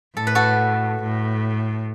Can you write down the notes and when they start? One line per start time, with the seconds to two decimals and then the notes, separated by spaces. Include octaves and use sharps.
0.17 A2 A4
0.27 B4
0.35 F#4 A4
1.03 A2